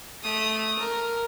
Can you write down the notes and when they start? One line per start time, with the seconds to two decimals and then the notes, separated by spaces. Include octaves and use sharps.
0.22 A3 D#6
0.79 A#4